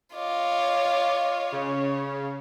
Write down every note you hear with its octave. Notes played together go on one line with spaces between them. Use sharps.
F4 C#5 D#5 D6
C#3 C#5